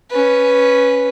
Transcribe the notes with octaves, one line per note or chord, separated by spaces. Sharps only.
C#4 B4